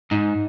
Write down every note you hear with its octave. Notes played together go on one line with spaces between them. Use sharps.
G#2 D#4